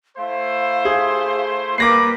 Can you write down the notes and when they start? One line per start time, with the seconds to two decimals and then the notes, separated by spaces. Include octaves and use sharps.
0.18 A3 E4 C5 F5
0.85 G#4
1.78 G3 A#3 B4 D6 A#6 C7